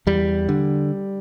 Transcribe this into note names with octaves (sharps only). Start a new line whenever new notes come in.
E2 G3
D3